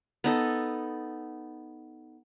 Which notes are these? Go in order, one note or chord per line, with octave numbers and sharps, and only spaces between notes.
B3 D#4 A4